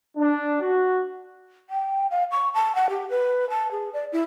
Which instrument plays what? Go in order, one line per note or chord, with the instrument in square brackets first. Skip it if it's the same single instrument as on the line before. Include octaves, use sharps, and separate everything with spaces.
[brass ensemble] D4
F#4
[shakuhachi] G5
F5
C#6
A5
F#5
G4
B4
A5
G#4
D5
E4